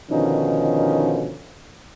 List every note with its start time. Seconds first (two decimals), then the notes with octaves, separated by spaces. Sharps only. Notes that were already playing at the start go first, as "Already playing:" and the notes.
0.11 B2 D3 D#3 F3 C#4 D#4